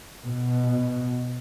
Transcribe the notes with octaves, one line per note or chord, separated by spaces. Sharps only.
B2